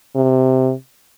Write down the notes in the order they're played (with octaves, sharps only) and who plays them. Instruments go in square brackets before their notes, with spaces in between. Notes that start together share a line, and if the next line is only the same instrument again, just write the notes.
[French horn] C3